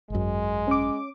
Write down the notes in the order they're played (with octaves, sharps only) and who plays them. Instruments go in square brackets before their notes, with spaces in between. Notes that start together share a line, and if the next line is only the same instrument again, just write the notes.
[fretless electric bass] G#1 F#2 [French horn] G#3
[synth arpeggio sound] C#4 D6